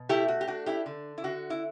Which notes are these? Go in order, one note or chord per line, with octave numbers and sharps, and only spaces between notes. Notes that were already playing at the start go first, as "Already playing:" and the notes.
Already playing: B2
A3 E4 G4
F#4
G4
D4 F#4
E4 G4
D3
E4
D3 F#4
E4